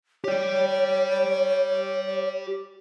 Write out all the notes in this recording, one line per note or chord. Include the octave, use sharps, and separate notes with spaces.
G4 C#5 D5